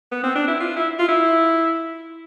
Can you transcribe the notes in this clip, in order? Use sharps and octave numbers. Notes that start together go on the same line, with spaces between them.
B3
C4
D4
E4
F4
E4
F4
E4